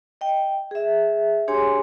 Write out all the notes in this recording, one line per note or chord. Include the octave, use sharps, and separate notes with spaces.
D#5 G5
G#4 E5
D4 G4 G#4 C#5 G#5 C6